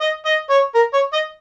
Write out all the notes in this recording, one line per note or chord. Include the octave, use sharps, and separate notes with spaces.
D#5
D#5
C#5
A#4
C#5
D#5